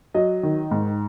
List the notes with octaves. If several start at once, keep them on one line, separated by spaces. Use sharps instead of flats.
F#3 D#5
D#3
G#2